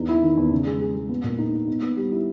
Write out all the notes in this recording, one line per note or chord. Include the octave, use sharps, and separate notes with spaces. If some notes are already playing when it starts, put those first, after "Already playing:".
Already playing: E2 D#4
E4
D#3
E2
C#3
G#3
G#3
G#3
B3
A#2
D#4
D#4
B3
B3
G3
E4